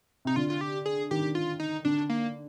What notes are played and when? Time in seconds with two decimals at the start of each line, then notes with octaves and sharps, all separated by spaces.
0.25 C3 D#4
0.36 D3 F4
0.50 F4
0.61 G4
0.86 G#4
1.11 D#3 G4
1.35 F4
1.60 D#4
1.85 D3 D4
2.10 A#3